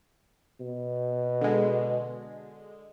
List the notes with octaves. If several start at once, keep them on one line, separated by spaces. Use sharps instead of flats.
B2
D3 G#3